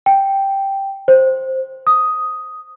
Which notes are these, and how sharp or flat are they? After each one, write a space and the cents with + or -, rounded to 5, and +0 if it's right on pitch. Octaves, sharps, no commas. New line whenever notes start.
G5 +0
C5 +5
D#6 +5